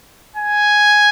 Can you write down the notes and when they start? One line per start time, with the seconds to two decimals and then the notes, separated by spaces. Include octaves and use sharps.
0.36 G#5